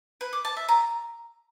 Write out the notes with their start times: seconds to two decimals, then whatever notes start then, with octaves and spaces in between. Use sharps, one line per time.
0.21 B4
0.33 D6
0.45 A5
0.57 E5
0.69 A#5